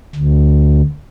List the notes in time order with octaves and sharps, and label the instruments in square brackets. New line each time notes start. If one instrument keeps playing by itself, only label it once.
[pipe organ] D2